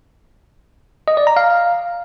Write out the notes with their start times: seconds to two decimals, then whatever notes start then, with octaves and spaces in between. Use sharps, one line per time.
1.08 D#5
1.17 D5
1.27 A#5
1.37 F5